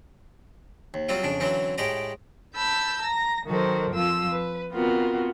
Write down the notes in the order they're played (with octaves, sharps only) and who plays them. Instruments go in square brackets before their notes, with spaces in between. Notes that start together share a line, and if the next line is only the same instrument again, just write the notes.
[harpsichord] D#2
F#3 G3 C4 F4
F2 C#3 D4
D3 E3 F#3 C4 C#4
A2 G#3 G4 D5 A#5
[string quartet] A5 B5 E6 G6
A#5 A#6
D#3 F#3 F#4 A4 A#4 C5
F2 F3 F4 E6
B4
B3 C4 F4 F#4 A#4